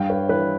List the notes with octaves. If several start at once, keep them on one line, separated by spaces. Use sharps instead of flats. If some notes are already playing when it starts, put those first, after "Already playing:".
Already playing: G2 F5 G5
B4 C#5
E3 B4 C#5